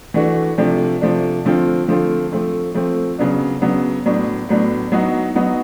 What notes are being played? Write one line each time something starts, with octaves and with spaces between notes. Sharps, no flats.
E3 A3 D4 F#4
C3 F3 A3 D4
C3 F3 A3 D4
D3 F3 A3 C4 F4
D3 F3 A3 C4 F4
F3 A3 C4
F3 A3 C4
C#3 F#3 B3 D4
C#3 F#3 B3 D4
A2 F#3 B3 D4
A2 F#3 B3 D4
F#3 B3 D#4 F#4
F#3 B3 D#4 F#4